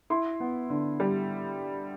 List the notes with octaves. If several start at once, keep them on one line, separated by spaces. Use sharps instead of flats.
E4 C6
B3
D3
G3